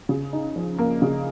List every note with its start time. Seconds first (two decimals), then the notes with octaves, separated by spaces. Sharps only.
0.09 C#3
0.33 D#4
0.56 F3
0.78 A#3
1.02 C#3